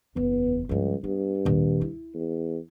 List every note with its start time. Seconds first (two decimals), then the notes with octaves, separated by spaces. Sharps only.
0.16 F#1 E2 B3
0.69 C#2 G2 F3
1.04 G2 B3
1.45 A#1 D#2
1.81 E4
2.14 E2